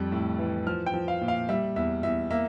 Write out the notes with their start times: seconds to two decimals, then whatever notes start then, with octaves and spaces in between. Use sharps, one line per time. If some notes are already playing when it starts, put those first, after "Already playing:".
Already playing: F2 G3
0.12 A2
0.39 E3
0.67 F3 F6
0.86 G5
0.94 F3
1.08 F5
1.21 A#2
1.28 F5
1.49 G3 E5
1.76 E2 E5
2.03 E2 E5
2.31 A#3 E5